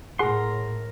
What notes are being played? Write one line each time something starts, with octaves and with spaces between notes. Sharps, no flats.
A2 G#4 A#4 F#5 C6